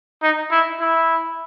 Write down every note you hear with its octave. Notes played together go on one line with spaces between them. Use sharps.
D#4
E4
E4